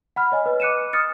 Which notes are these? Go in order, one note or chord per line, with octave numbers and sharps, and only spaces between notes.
F#5 B5 F6
C#5 D#5 G#5
B4 D#5
D6 F#6 C#7 D#7 E7
D#6 F6 A6 C#7